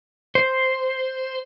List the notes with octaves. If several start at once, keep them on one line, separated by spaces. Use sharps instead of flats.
C5